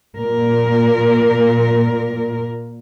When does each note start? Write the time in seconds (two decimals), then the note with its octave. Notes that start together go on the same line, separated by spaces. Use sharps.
0.16 A#2 A#4